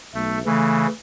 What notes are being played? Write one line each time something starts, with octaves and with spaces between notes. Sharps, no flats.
B1 A3
C#3 E3 A3